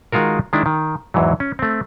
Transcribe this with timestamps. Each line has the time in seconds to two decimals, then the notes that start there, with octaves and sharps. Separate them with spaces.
0.12 D#3 G#3 F4 F#4 A#4
0.53 D#3 G#3 D4 E4
0.66 D#3
1.14 E2 G#2 E3 F#3
1.40 C#4
1.59 A3 C4